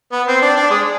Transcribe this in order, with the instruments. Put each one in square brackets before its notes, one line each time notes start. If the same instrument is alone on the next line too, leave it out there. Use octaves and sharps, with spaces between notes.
[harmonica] B3
C4
D4
D4
G#3